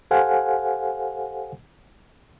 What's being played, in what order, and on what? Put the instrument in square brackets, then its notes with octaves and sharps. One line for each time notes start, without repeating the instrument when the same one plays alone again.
[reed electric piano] G4 A4 C5 F5 F#5 G#5